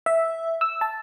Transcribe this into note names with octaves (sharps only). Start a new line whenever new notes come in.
E5
E6
A5